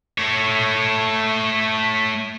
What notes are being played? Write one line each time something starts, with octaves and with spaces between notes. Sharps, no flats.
A3 C#5